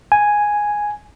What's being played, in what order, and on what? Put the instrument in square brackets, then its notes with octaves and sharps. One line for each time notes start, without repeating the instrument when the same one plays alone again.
[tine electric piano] G#5